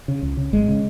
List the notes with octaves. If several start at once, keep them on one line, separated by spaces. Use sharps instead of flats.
C#3
C#2
C#3
G#1 G#3
C#3